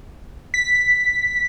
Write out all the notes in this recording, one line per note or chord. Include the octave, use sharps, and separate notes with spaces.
B6